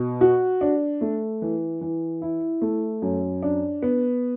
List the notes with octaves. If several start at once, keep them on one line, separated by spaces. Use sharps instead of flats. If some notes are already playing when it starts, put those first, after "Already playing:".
Already playing: B2
F#4
D4
A3
E3
E3
E4
A3
F#2
D4
B3